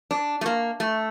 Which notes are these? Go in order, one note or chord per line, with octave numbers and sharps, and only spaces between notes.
D4
A3
A#3
A3